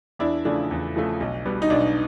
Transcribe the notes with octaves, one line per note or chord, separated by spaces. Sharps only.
E2 D4 E4
C#3 F3 A3 D4
E2
C#3 F3 A3
B1
B2 G3 B3
D#4
B1 D4